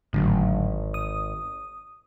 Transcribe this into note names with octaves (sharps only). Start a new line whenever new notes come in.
G#1 A2 D3 F#3
D#6